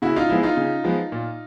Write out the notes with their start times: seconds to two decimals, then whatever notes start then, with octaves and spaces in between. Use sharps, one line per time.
0.02 C#3 E4 F#4
0.16 D#4 F4
0.30 F3 G#3 B3 E4
0.43 D#4 F4
0.57 C#3
0.84 F3 G#3 B3
1.12 A#2